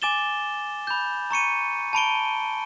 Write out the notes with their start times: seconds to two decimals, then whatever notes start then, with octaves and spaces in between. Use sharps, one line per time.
0.02 G#5 D6 A6 E7 G7
0.87 B5 G6
1.31 A#5 C#6 C#7 D#7
1.93 A5 B5 D7 G7